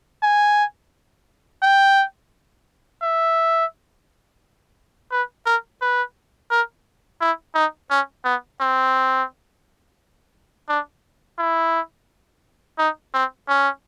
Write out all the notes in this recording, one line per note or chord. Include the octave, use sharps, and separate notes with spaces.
G#5
G5
E5
B4
A#4
B4
A#4
E4
D#4
C#4
B3
C4
D4
E4
D#4
C4
C#4